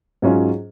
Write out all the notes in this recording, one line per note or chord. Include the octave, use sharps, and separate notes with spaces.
G#2 F#3 C#4 F4